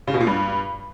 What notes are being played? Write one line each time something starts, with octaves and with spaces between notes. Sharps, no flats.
C#3
B2
A#2
G2